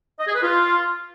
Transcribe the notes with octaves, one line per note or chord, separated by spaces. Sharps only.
D#5
G#4
B4
F4